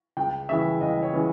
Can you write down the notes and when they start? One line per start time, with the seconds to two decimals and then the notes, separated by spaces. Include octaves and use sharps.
0.17 C#2 G5
0.49 C#3 E3 E5
0.81 C#2 D#5
1.02 C#5
1.14 C#3 E3